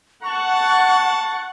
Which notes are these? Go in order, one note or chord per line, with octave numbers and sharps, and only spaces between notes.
F#5 A5 C#6